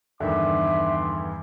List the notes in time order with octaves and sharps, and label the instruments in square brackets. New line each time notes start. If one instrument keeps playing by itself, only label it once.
[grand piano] E2 G2 [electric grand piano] D3 D#3 [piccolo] E5 [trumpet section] C6 D6